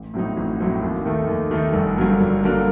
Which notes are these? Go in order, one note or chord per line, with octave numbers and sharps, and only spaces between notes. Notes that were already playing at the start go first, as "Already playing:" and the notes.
Already playing: A1
A2 F#3 C4 D#4
A1
A2 F#3 C4 D#4
D#2
D#3 A3 D#4
D#2
D#3 A3 D#4
G1
G2 D3 F#3 A#3
G1
G2 D3 F#3 A#3